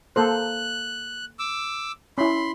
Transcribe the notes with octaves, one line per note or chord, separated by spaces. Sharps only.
A#3 A4 C5 F#6
D6 E6
C#4 E4 B5 C6